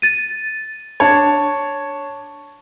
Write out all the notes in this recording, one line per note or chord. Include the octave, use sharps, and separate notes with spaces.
A6 D#7
D4 C#5 A5 G#6